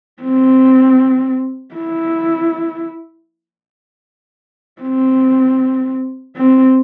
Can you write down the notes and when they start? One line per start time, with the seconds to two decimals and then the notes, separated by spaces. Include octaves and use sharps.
0.22 C4
1.75 E4
4.82 C4
6.36 C4